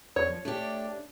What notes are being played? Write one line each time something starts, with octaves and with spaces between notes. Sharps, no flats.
F2 C#5
F3
A3 D4 G4